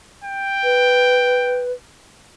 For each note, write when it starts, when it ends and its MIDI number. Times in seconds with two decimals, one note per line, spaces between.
0.24 1.64 79
0.63 1.72 71